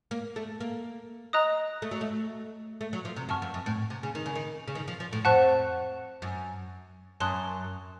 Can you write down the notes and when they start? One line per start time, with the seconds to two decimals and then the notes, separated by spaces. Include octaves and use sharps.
0.11 A#3
0.36 A3
0.60 A#3
1.33 D#5 A#5 D#6 F#6
1.82 A3
1.91 F#3
2.01 A3
2.81 A3
2.93 F#3
3.05 F3
3.16 C3
3.29 F#2 F#5 A5 C#6 F6
3.42 F2
3.54 F#2
3.66 A2
3.90 C3
4.03 C#3
4.15 D#3
4.26 C#3
4.35 D#3
4.68 C#3
4.75 D#3
4.88 F3
5.00 F3
5.13 A2
5.25 F2 C5 F#5 A5 C#6 F#6
6.22 F#2
7.20 F#2 C#5 A5 C6 D#6 F#6